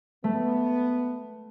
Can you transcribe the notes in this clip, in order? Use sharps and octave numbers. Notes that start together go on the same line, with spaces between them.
A3 B3